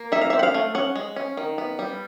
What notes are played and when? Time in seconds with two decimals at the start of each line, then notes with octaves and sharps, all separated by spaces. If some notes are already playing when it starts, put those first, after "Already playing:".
Already playing: A#3
0.12 D#4 E5
0.21 F5
0.30 C4 E5
0.39 F#5
0.43 F5
0.54 A3
0.75 C#4 F#5
0.96 G#3
1.16 C#4
1.37 D#3
1.58 B3
1.79 G3